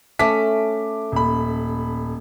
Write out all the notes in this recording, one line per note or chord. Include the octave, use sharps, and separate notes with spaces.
A3 C#4 D6 B6
D#1 B5